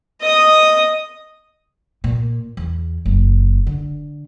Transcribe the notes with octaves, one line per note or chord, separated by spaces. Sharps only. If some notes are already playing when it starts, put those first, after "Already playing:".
D#5 D#6
A#2
E2
F#1
D3